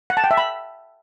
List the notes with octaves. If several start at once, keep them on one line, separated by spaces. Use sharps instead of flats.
F#5
A5
G5
E5
B5